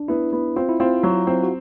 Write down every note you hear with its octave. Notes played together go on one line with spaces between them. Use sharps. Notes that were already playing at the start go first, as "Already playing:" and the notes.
Already playing: D4
B3 E4
B3
C4 F4
E4
C4 F4
F#3
C4
F#4